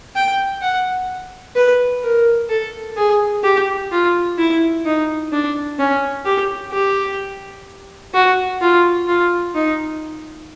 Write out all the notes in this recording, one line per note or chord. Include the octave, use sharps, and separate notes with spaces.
G5
F#5
B4
A#4
A4
G#4
G4
F4
E4
D#4
D4
C#4
G4
G4
F#4
F4
F4
D#4